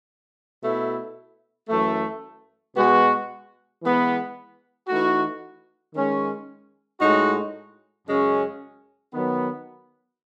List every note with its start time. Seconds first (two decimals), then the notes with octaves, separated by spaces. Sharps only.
0.61 B2 A3 E4
1.69 F#2 E3 A3
2.75 B2 G#3 B3 F#4
3.82 E3 G#3 B3
4.88 E3 A3 D#4 F#4
5.94 D#3 G#3 C#4
7.00 A2 G#3 D#4 F#4
8.07 F#2 C#3 G#3 C#4
9.13 D#3 F#3 B3